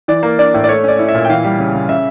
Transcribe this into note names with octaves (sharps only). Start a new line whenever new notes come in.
E3 D5
A#3
D4 D5
A2
D5
A3 C#5
C#4 D5
E4
E5
A#2
G5
E3 F5
G3
C#3
C#3
C#3 E5